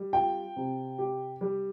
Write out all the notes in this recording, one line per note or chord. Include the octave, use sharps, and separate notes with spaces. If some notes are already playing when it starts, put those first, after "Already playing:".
Already playing: G3
F4 G5
C3
G4
G3